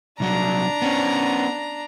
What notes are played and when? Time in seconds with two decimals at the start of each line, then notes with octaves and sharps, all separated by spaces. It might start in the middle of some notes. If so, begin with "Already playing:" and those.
0.20 C2 F#3 D4 A#5
0.82 B3 C#4